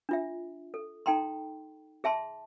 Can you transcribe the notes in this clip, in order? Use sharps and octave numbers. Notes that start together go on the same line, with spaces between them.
D4 F4 E5
A4
D#4 A4 G5 A#5 C6
G#4 E5 A5 C6